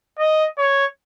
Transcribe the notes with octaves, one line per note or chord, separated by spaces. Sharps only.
D#5
C#5